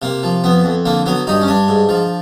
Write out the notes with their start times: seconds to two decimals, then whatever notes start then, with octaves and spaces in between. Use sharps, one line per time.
0.02 C3 A#3
0.23 F3
0.44 F2 B3
0.64 F2
0.85 D3 A#3
1.06 F#3 B3
1.27 G2 D#4
1.42 C#4
1.48 G2 D4
1.68 G#2
1.89 F3